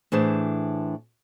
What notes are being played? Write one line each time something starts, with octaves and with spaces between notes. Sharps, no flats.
A2 E3 D4 G#4 C5